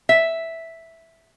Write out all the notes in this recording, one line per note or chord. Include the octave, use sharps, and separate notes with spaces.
E5